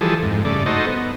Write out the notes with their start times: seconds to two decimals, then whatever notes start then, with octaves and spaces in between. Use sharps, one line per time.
0.01 E3 F3 G3 G#4 A4
0.23 F2 G#2
0.45 G2 C#3 A3 D5
0.66 D#4 F#4 A4 C5 D#5
0.86 B3